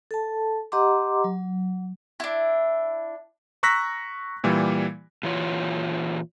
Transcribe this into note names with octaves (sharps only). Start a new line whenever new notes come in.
A4 A5
G4 D#5 F#5 A#5 C6 D6
F#3
D4 E4
A#5 C#6 E6 F#6 A#6 B6
A#2 E3 G3
A#2 E3 F4 C#5